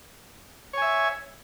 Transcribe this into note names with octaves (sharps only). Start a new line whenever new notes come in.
C#5 E5 G#5